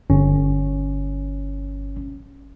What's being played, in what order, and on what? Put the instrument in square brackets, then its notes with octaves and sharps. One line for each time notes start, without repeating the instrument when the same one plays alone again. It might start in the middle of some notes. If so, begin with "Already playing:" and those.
[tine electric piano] G1 C#4